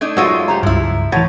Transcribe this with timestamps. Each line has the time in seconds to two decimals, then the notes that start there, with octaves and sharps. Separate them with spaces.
0.01 A3 D4 D#4 G#6
0.17 F#2 G#3 F4 F#5 C#6 E6
0.48 A3 G4 C5 A#5
0.63 C#2 G2 F3 E4
1.12 A2 E3 F#5 A5 G#6 A6